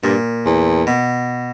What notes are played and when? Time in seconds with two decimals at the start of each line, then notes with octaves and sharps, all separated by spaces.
0.04 G2 A#2
0.46 E2
0.87 B2